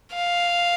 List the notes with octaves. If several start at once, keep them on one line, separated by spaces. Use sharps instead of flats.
F5